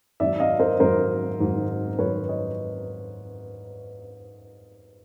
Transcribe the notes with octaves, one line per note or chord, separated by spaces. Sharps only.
G#2 D#3 F#3 D5 E5
D#5 F5
A#4 C5
G#2 D#3 F#3 A#4 C5
G#2 D#3 F#3
G#2 D#3 F#3 B4 C#5
C#5 D#5